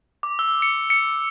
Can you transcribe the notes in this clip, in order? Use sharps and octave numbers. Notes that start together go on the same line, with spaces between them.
D6
E6
C#7
C#7